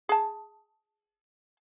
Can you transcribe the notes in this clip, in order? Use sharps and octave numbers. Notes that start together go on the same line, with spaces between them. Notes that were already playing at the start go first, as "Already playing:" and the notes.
G#4 A5